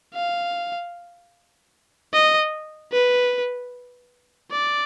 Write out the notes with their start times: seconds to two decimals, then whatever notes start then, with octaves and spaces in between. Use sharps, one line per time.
0.14 F5
2.13 D#5
2.92 B4
4.52 D5